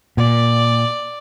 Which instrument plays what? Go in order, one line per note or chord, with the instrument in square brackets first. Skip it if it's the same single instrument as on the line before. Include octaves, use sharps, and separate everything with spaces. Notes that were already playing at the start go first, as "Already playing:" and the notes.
[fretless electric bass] A#2 [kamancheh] D5